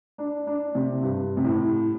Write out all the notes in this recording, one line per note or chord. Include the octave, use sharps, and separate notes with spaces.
D4
D4
C3
G2
C3
A2